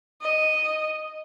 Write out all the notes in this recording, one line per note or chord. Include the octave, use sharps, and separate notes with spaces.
D#5